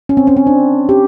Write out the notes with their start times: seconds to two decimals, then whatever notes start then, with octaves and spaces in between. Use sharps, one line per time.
0.09 C#4
0.17 C4
0.27 C#4
0.37 C4
0.47 D4
0.89 G4